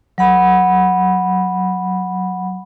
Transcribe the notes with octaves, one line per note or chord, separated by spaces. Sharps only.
F#3 F#5 B5